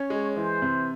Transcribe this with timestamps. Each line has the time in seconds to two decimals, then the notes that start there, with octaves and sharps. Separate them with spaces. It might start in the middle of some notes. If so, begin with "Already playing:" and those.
Already playing: C#4 C#5
0.10 G#3
0.36 E3 C5
0.62 C3